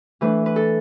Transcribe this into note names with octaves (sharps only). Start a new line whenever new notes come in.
E3 A3 D4 B4
B4
A4